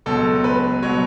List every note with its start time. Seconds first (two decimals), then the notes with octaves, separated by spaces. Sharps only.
0.06 C#2 B2 F#3 A4
0.44 B4
0.82 B2 F#3 C#5